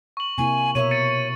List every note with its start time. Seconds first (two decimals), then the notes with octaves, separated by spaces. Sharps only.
0.17 C#6 F#7
0.38 C3 A#3 E4 G#5
0.75 B2 A#4 C#5 E5 C#6 D#7
0.91 A6 C#7 D#7